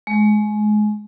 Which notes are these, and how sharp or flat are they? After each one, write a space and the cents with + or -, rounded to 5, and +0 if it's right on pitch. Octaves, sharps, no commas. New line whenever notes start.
G#3 +25